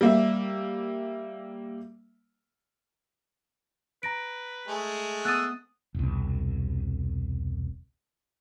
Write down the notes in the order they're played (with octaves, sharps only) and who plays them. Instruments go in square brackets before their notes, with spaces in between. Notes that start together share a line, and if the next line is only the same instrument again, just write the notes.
[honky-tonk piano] G3 A#3 E5
[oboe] B4 [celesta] A#5 A#6 D7
[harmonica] G#3 A3 G#4
[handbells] B3 D#6 [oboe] E6 [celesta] F#6 A6 D#7
[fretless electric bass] E1 C2